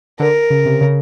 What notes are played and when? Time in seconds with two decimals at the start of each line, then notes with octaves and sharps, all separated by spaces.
0.20 D3 A#4
0.50 C#3
0.66 C3
0.81 C#3